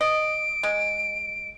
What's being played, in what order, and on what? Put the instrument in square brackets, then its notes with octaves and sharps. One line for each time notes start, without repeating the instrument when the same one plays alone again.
[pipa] D#5 [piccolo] D7
[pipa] G#3